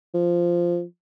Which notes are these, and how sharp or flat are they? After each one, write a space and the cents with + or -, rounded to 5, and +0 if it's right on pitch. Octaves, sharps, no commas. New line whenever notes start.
F3 -5